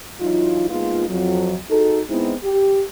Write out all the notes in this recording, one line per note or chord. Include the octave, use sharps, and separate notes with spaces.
E3 F#3 D#4 F4
G#3 A#3 B3 D#4 F4
F2 F#3
D#4 F#4 G#4 A4
G#3 B3 C4 D#4 E4
G4